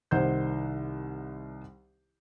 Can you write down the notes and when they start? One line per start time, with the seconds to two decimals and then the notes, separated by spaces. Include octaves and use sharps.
0.11 C2 D#3 C5 F#5 G6